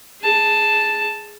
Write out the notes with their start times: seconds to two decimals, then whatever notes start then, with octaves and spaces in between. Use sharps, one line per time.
0.21 G#4 A5